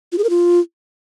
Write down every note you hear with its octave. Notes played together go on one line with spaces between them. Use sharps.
F4
G#4
A#4
F4